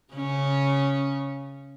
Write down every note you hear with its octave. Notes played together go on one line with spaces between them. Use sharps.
C#3 C#4